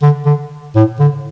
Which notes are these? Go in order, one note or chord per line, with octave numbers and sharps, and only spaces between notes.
D3
D3
A2
D3